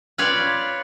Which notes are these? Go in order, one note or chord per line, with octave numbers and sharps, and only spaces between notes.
F4 B4 C#5 D5